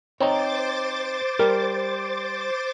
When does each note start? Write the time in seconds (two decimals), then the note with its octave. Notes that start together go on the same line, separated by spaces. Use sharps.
0.21 C4 D#4 C5 C#5 A#5 D6 A6
1.39 G3 A#4